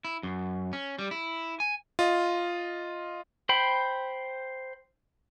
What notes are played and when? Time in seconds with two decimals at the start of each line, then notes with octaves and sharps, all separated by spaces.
0.05 E4
0.23 F#2
0.73 C#4
0.99 G3
1.11 E4
1.60 G#5
1.99 F4 D#5
3.49 C5 G5 B5